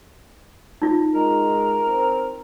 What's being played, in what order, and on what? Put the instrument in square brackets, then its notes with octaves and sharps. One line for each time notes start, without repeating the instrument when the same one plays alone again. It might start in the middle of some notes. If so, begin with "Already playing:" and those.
[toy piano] D#4 F4
[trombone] G#3 [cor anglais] A#4
[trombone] C4